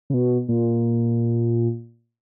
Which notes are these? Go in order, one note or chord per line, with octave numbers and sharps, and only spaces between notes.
C#3
B2
A#2